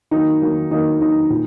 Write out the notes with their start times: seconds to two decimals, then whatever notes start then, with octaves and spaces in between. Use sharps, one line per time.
0.11 D#3 F#3 A#3 D#4
0.42 D#3 F#3 A#3
0.71 D#3 F#3 A#3 D#4
1.00 D#3 F#3 A#3 D#4
1.30 A#2